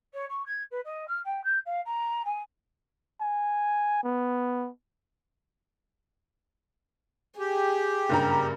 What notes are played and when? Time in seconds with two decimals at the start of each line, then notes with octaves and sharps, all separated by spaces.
0.13 C#5
0.29 C#6
0.45 G#6
0.71 B4
0.84 D#5
1.07 F6
1.24 G5
1.44 G6
1.65 F5
1.85 A#5
2.25 G#5
3.21 G#5
4.04 B3
7.39 G4 G#4
8.09 F#1 G2 A#5